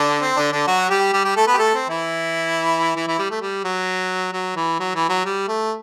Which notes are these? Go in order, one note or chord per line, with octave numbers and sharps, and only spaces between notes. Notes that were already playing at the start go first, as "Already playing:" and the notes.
Already playing: D3 D4
C4
D3 D4
D3 D4
F#3 F#4
G3 G4
G3 G4
G3 G4
A3 A4
B3 B4
G4
A3 A4
C4
E3 E4
E3 E4
E3 E4
G3
A3
G3
F#3
F#3
E3
F#3
E3
F#3
G3
A3